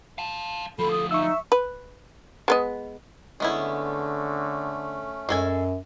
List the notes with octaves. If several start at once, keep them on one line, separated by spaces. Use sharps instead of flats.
F5 A5
D2 F3 A4 B5
D#6
D#4 E5 C#6 E6
B4
G#3 B3 D#5
D3 G#3 A3 B3 C#4 E4
F#2 G#3 A4 G#5